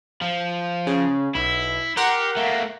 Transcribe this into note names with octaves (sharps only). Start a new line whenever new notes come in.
F3
C#3
B1 E4
G4 A#4 F#5 C6
A3 A#3